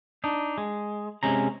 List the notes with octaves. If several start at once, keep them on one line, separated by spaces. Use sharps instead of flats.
D4 D#4
G#3
C3 G#3 C#4 A#5